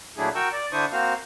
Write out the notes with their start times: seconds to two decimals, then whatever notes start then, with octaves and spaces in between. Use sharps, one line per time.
0.18 A#2 F#3 A3 D4 E4 G#4
0.35 F#4 A#4 G5 C#6 E6
0.53 D5
0.72 D3 D4 E4 C5 C#6 D#6
0.92 A#3 C4 F#4 C5 F5